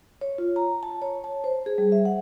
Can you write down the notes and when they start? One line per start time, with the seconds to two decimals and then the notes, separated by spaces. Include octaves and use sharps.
0.21 C#5
0.38 F4
0.56 A#5
0.83 A5
1.02 C#5
1.24 A5
1.44 C5
1.66 G#4
1.78 G3
1.92 E5
2.05 F#5